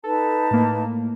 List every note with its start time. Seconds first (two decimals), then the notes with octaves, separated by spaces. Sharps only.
0.04 D#4 A4 B4 A5
0.51 A2 A#3